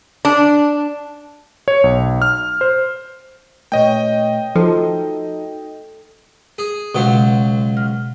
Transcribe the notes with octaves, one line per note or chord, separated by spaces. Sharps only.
D4
C#5
B1
F6
C5
A#2 A3 B4 C#5 D#5 G5
F3 D#4 F#4 A4
G#4
C#2 B2 F#3 C5
F6